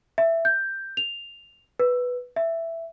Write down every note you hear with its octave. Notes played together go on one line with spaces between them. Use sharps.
E5
G6
F7
B4
E5